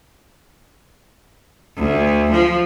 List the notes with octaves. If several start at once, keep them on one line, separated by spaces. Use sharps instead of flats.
D2
F3